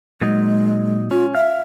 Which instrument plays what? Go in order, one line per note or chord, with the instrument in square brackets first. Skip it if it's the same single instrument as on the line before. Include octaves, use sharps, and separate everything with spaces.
[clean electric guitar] A#2 F#3 D#4 [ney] G#3
[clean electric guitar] C#4 [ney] F4
[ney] E5 [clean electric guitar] F5